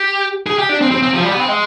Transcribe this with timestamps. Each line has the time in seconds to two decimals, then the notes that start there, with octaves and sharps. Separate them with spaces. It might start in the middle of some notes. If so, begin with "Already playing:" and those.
Already playing: G4
0.47 G#4
0.58 G4
0.69 D4
0.81 C4
0.91 C4
1.03 C4
1.14 F3
1.23 G3
1.31 B3
1.40 C4
1.48 G#3